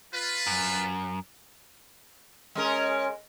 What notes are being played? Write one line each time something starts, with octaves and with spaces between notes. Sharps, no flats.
F4 B4
F#2
G#3 C#4 A#4